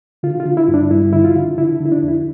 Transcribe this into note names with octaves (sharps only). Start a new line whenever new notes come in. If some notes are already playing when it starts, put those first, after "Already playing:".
D3 F4
F4
D3
E4
G2
D4
G2 E4
D3 E4
F4
D3
D3 E4
D3
E4
D4
F2
E4